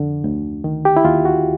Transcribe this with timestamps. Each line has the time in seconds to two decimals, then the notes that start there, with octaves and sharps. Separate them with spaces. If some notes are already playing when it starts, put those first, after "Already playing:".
Already playing: F2 D3
0.24 D2
0.64 D#3
0.85 G4
0.97 E4
1.04 D#2 F4
1.25 F#4